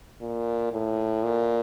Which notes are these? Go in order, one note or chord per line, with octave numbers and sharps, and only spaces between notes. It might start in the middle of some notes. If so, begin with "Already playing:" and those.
A#2
A2
A#2